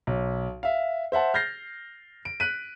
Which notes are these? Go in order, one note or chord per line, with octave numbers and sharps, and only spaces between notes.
B1
E5 F5
C5 E5 F#5 A5
F6 G6 A6 A#6 C7
D7
F#6 B6 D#7